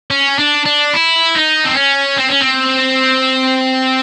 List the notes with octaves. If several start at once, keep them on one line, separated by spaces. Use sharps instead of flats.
C#4
D4
D4
E4
D#4
C4
C#4
C4
C#4
C4